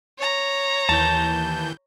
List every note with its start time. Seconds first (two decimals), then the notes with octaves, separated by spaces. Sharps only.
0.18 C#5 A#5
0.89 D#2 E3 A5 G6